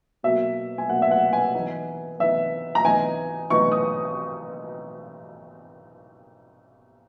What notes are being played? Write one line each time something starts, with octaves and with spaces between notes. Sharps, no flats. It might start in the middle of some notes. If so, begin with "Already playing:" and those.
B2 F#3 A#3 E5
G#5
B2 F#3 A#3 F#5
E5
F#5
G#5
E3 B3 D#4
E3 B3 D#4 E5
A#5
E3 B3 D#4 G#5
E3 B3 D#4 C#6
D#6